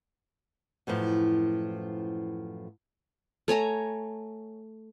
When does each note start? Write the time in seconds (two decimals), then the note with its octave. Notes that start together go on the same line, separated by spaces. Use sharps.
0.87 F#2 A2 E3 F3
3.48 A3 C#5 G#5 A#5